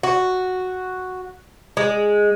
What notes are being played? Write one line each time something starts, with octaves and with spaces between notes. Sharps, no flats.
F#4
G#3